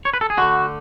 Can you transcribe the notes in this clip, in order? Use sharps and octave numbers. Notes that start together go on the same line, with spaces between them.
C#5
B4
A4
G#4
D3 A3 F#4